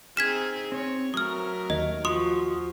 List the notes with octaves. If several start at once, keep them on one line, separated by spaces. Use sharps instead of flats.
C4 D#4 G#4 F6 G#6 B6 E7
C4 C#5
F#3 A3 A#4 D#6 F6
D#2 D#5
F3 F#4 C6 D#6